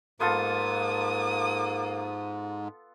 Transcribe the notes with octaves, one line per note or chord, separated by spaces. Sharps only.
G#2 A#3 B3 F4 A4 D#6